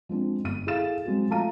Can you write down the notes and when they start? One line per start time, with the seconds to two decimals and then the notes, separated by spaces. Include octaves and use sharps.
0.09 F3 G#3 C4 D4
0.44 G1 D#7
0.67 E4 G#4 A4 F5 A6 E7
1.06 F#3 G#3 C4 F#4
1.30 F3 A3 F5 A5 A#5 D#7